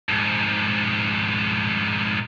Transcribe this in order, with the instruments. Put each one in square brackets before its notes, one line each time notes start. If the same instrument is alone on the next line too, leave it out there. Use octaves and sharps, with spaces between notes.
[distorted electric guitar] F2 G#2